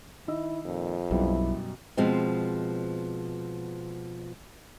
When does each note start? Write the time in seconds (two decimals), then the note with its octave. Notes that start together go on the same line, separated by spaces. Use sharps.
0.28 D#3 E4 D#5 E6
0.66 F2 A#2
1.11 B1 F#2 B2 G3 E4
1.97 B2 F3 G#3 C4